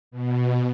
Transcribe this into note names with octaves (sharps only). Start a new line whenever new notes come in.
B2